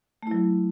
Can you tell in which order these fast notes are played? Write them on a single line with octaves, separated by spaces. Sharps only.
A3 E4 F#3